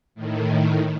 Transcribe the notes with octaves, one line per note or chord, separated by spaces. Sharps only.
A2 D#3